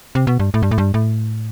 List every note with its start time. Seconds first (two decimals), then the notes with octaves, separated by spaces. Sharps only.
0.15 C3
0.27 B2
0.39 G2
0.54 A2
0.62 G2
0.71 A2
0.78 G2
0.94 A2